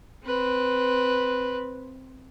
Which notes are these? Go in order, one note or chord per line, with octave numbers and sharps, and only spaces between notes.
C4 B4